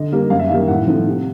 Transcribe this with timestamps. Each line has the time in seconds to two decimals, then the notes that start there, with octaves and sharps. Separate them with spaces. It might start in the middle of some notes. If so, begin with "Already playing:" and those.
Already playing: D3 D#5
0.12 G3 A#3
0.30 F#2 F5
0.39 E5
0.49 D#3 F5
0.52 G3 A#3
0.68 A2 F#5
0.87 F3 A3 C4
1.06 C3